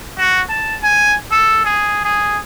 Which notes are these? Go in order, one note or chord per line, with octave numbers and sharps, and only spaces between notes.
F#4
A5
G#5
A4
G#4
G#4